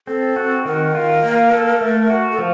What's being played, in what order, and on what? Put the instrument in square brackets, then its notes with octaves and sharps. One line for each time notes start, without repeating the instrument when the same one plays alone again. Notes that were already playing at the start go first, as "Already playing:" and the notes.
[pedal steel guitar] C4 [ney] A4
[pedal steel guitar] F#4
[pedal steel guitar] D#3 [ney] A#4
[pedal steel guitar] F4
A#3
A4
A3
F#4
[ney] A4
[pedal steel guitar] F3